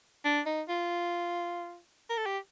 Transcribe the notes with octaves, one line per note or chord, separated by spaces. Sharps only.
D4
D#4
F4
A#4
A4
G4